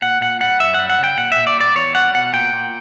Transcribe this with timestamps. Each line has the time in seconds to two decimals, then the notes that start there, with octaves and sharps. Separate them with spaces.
0.02 A#2 F#5
0.21 A#2 F#5
0.41 G3 F#5
0.60 F#2 E5
0.74 G3 F#5
0.90 F#5
0.99 C#3 G5
1.18 A#2 F#5
1.32 E5
1.37 A#2
1.47 D5
1.57 G3 D5
1.75 E2 C#5
1.95 G3 F#5
2.14 B2 F#5
2.33 A#2 G5
2.53 A#2